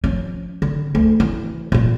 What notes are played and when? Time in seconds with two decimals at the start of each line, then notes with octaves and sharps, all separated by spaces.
0.04 F3 C#4
0.62 D3
0.95 D2
1.20 E3
1.72 A#2 F4